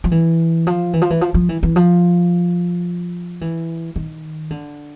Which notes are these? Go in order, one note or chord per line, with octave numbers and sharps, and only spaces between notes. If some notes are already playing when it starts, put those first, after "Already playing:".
F3
E3
F3
E3
F3
E3
F3
F3
E3
E3
F3
E3
D#3
D3